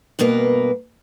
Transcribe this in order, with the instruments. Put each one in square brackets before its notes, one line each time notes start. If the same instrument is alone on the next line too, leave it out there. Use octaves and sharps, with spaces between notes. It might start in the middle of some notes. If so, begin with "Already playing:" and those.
[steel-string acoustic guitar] G2 B2 A#3 A#4 B4